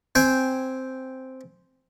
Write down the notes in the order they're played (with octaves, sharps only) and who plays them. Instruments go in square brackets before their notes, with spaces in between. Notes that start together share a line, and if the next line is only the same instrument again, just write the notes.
[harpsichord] C4 G5 G#5